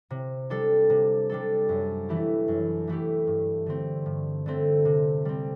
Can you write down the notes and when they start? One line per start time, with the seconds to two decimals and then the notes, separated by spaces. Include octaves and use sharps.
0.11 C3
0.50 G3 D4 A4
0.90 C3
1.30 G3 D4 A4
1.69 F#2
2.09 E3 A3 E4 G4
2.48 F#2
2.88 E3 A3 E4 G4
3.27 G2
3.66 D3 A3 C4
4.06 G2
4.46 D3 A3 C4
4.85 C3
5.25 G3 C4